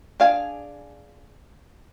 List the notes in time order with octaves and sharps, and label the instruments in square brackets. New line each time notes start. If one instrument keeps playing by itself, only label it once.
[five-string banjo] D4 G#4 F5 G#5